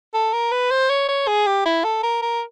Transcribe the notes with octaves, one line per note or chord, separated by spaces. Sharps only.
A4
A#4
B4
C5
C#5
C#5
G#4
G4
E4
A4
A#4
A#4